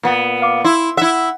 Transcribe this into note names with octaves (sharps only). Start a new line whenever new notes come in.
A#2 B3
F5 D6
E4 C6
E4 E5 F#5